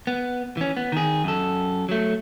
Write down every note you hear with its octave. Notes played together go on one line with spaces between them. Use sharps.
B3
E3 C#4
B3
D#3 G#4
F#2 A4
F#3 A3